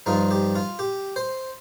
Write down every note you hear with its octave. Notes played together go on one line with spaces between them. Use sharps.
G2 F3 D#4 F4
G4
F4
G4
C5